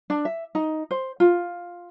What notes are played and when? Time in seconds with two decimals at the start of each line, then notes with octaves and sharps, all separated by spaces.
0.10 D4
0.25 E5
0.55 D#4
0.91 C5
1.20 F4